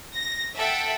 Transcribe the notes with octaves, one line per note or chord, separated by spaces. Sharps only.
A#6
A4 E5 F#5 G5